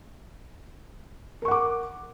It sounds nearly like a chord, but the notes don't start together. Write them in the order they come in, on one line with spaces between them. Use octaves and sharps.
A#4 C#6 F#5 D6